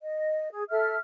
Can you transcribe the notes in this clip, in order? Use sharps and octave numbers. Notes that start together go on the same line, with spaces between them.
D#5
G#4
A4 E5 F6